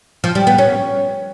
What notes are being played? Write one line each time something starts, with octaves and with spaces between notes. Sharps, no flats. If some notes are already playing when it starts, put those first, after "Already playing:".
F3
G3
B3
C#4